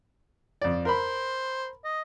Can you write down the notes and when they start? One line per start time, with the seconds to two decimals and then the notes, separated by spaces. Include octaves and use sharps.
0.61 F2 D5
0.85 A#4 C5 B5
1.84 D#5